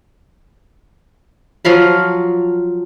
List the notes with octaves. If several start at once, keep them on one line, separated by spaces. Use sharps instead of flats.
F3 F#3 F5 B5